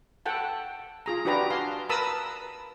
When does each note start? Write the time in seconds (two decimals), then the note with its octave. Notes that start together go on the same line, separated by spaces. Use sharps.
0.26 A4 F#5 G5 A5
1.06 F4 G#4 A#5
1.25 D4 F#4 G4 B4 D5 A#5
1.50 F5 G#5 A5 C6
1.89 A#4 B4 A5 B5 D#6 E6